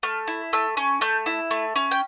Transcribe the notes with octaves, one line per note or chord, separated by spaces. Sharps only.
A3 F6
E4
A3 E6
C#4
A3 G6
E4
A3
C#4
G5